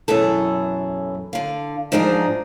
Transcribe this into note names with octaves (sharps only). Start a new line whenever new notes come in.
F#2 B2 E3 G#4 A4
D3 F5
G#2 F3 D4 D#4 G#4